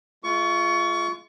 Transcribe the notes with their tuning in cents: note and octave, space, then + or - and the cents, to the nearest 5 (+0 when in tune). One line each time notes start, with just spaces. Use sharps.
G#3 +35 F4 -15 C#6 +20